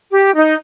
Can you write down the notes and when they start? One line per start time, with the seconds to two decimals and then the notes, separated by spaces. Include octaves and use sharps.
0.11 G4
0.34 D#4